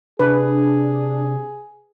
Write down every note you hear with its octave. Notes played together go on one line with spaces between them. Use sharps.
C3 D4 G#4 B4